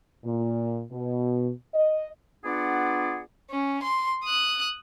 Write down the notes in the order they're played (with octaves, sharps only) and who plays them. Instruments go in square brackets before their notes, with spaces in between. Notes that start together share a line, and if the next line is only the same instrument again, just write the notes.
[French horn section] A#2
B2
D#5
[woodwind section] B3 D4 F4 G#4 D5 F#5
[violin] C#4
C6
D#6 F#6